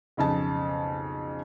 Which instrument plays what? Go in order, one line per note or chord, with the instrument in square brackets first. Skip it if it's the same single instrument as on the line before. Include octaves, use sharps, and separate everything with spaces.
[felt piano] B1 F2 C#3 A5